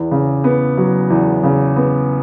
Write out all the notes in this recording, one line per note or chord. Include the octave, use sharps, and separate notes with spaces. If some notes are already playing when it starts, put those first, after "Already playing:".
Already playing: E2
C#3
B3
F#3
E2
C#3
B3